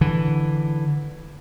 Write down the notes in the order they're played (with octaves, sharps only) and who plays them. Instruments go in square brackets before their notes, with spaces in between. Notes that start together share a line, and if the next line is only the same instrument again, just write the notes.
[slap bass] D3 E3